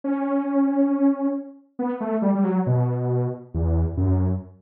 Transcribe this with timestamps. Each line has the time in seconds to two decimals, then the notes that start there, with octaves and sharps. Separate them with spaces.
0.04 C#4
1.79 B3
2.01 A3
2.22 G3
2.35 G3
2.44 F#3
2.67 B2
3.54 E2
3.97 F#2